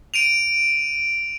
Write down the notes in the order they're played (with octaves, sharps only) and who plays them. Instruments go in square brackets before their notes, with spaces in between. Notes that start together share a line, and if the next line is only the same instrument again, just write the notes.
[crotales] D7 D#7 F7